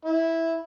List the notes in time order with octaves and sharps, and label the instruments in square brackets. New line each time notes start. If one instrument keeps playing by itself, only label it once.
[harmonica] E4